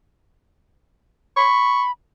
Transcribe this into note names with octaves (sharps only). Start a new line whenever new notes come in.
B5 C#6